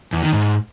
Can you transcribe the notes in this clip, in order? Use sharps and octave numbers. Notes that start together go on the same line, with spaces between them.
E2
D#3
G#2